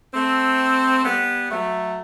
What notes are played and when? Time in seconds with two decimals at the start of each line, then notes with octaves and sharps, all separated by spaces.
0.13 A3 C4
1.04 G3 B3
1.50 F#3 A3